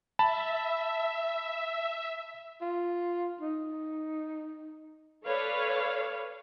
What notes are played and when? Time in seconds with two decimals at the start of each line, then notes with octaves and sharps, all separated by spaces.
0.19 E5 A5 B5
2.61 F4
3.41 D#4
5.26 A4 B4 C#5 D5 F5